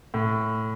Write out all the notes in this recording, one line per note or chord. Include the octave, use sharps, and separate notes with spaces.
A2